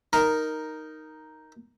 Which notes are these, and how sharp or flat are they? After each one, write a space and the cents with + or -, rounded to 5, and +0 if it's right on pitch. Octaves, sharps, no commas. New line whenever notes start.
D#4 +0 A#4 +0